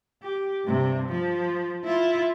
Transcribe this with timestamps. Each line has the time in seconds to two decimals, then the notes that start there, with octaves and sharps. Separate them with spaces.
0.23 G4
0.64 G2 C3
1.09 F3
1.84 E4 F4